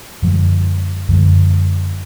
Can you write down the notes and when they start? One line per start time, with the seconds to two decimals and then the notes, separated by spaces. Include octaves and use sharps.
0.22 F#2 D3 F3 G#3
1.09 F#2 D3 F3 G#3